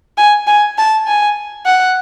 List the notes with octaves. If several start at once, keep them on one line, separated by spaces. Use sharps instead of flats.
G#5
G#5
A5
G#5
F#5